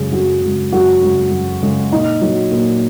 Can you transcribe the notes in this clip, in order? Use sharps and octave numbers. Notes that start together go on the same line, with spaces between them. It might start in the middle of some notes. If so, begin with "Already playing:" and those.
Already playing: F#2 C#3 G#3 G#4
F#2 F#4
C#3 G#3
F#2 F#4
C#3 G#3
F#2
C#3 G#3
A#2 D#4
F#3
A#2